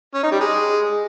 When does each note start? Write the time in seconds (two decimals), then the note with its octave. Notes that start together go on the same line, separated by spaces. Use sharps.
0.14 C#4
0.23 D#4
0.32 G3
0.41 G#3